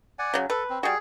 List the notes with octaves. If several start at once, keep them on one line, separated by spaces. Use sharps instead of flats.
D5 F#5 G#5
C#3 F#3
A4 B4
C4
G3 F#4 G#4